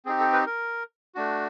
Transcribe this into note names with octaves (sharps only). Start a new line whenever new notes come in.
C4 D#4 G4 G#4
A4
B4
A#4
A3 D4 F#4